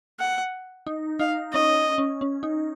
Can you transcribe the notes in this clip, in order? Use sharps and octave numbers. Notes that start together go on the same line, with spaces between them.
F#5
D#4
D#4 F5
C#4 D#5
C#4
C#4
D#4